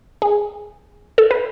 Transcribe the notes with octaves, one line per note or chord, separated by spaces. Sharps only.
G#4
A4
B4